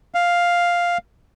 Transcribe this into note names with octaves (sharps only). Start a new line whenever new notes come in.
F5